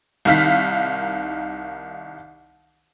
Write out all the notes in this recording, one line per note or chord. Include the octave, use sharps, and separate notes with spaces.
C2 D#3 F5 B6